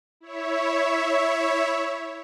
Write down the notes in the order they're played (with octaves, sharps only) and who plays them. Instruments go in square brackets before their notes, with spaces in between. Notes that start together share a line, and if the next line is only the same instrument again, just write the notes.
[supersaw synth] E4 C#5 E5